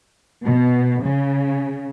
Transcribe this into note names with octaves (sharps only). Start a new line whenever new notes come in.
B2
C#3